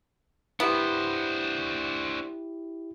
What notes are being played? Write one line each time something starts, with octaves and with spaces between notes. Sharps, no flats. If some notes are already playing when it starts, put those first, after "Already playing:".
B3 D4 E4 G4 C5